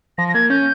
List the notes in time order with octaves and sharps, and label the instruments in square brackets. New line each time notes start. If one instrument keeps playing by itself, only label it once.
[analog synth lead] F3 [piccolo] A#6
[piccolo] A#6
[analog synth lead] A#3 [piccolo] G#6
[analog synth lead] C#4 [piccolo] G6